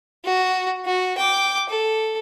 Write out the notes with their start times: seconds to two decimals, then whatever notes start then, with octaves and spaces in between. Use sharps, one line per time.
0.25 F#4
0.86 F#4
1.18 G5 D6
1.69 A4